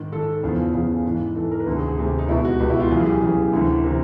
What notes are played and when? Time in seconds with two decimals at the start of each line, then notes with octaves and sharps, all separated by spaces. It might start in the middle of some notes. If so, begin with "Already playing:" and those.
Already playing: G#2 D#3
0.12 G#2 D#3 A4
0.43 E2 C#3 F3
0.73 E2 C#3 F3 G#4
1.05 G#2 E3
1.36 G#2 E3 A4
1.51 A#4
1.60 B4
1.67 D2 C3 D#3 A#4
1.76 G#4
1.88 G#4
1.97 D2 C3 D#3 G4
2.18 D#4
2.28 C#2 E4
2.31 B2
2.45 F#4
2.60 C#2 B2 G4
2.70 E4
2.80 F4
2.90 F#2 C#3 E3
3.00 G#4
3.06 G4
3.21 F#2 C#3 E3 G#4
3.53 D2 C3 E3
3.84 C3 E3 A#4